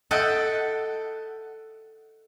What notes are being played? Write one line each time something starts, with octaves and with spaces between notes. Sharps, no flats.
A4 D#5 E5 F#5 G5